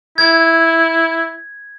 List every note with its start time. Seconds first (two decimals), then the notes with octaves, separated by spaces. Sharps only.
0.18 E4 G#6